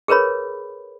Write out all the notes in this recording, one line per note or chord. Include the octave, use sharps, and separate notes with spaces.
G#4 A#4 B4 C#5 B5